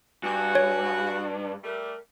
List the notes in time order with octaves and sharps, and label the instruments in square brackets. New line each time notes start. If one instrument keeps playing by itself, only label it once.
[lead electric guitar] G2 [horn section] F#4 [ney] G#5
[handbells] C#5
[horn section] G3 A3 [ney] A#4